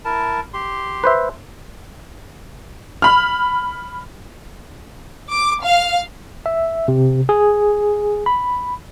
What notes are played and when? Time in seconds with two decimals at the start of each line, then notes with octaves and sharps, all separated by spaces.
0.05 E4 A#4 A5
0.54 G4 C6
1.04 B4 C5 E5
3.02 B5 F6
5.32 D6
5.63 F5
6.46 E5
6.88 C3
7.29 G#4
8.26 B5